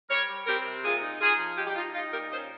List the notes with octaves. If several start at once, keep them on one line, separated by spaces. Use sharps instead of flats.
G3 A#4 C#5
G3
C4 G4 A#4
C3
A#2 F4 G#4
D#4
D#4 F4 G#4
F3
D#4 G4
G4
D#4 F4
D#4 F4
A#2 G4 A#4
C#4 C5 D#5